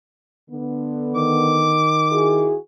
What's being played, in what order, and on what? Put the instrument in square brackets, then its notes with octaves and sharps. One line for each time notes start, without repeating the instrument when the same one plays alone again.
[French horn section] D3 B3
[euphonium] D#3 [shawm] D6
[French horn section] E4 F#4 G#4